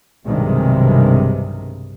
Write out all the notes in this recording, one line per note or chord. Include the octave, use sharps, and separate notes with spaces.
B1 G2 C3 D#3 G#3